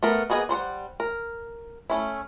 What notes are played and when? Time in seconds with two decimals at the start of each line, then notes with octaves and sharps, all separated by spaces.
0.03 A3 B3 A#4
0.30 A#3 B3 G#4 D5 D#5
0.49 G3 C5 C#5 F#5
1.00 A#4
1.90 A3 C#4 E4